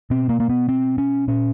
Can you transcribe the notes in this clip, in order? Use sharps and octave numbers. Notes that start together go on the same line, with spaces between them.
B2 C4
A#3
A#3
B3
C4
C#4
A#2 C#4